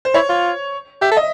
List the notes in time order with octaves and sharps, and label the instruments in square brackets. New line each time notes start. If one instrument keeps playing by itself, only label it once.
[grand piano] C5
[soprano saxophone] E4 [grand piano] C#5
[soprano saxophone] F4
[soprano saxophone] G4 [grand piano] E5
[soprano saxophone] A4
[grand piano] D#5